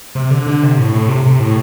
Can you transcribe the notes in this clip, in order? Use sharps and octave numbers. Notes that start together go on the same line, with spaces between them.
C3
D3
D3
C3
A2
A2
C3
C3
A2